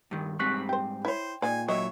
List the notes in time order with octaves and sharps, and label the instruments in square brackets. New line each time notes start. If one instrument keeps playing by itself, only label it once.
[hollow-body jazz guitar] G2 D#3
[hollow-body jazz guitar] G#2 G3 C4 [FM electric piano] C#6 F#6 B6
[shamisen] G4 C5 [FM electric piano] G5
[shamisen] E4 C#5 [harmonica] C5
[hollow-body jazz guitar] A#2 [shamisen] D#3 G#3 D5 [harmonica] G#5
[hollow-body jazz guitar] A#2 F#3 [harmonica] C#5 E5 [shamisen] D#5